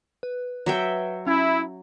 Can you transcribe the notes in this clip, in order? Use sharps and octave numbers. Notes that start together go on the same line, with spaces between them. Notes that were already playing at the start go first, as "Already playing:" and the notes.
B4
F#3 E5 G5
C#4 E4